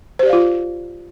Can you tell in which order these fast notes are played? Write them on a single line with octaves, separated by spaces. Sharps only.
C5 G4 D5 F5 F4